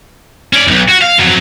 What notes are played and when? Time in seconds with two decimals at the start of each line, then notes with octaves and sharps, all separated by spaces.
0.53 C#4 D5
0.67 B1 E2
0.88 F#4
1.01 F5
1.18 F2 F#3